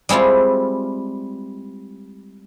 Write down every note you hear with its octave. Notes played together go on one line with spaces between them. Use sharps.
G3 G#3 C4 E4 F4